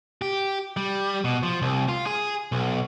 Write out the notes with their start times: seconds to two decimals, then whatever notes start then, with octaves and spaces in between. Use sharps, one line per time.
0.22 G4
0.77 G3
1.24 B2
1.43 F3
1.62 C2
1.89 F4
2.06 G#4
2.52 B1